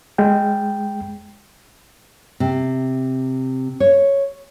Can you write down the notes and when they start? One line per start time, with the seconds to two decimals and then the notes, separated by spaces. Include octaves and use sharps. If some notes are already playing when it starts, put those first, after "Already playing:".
0.18 G#3 G5
2.40 C3
3.80 C#5